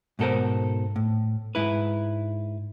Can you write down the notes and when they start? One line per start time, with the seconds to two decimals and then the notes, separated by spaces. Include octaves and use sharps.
0.19 G#2 B2 A4 A#4 C5
0.96 A2
1.55 G#2 E4 B4